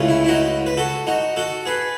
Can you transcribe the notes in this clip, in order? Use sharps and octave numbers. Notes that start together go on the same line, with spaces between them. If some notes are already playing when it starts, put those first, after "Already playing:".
Already playing: C#2 C#3 E3 A3 C#4
E4
E4
D#4 F#4
B4
F#4 A4
D#4 F#4
F#4 A4
G#4 B4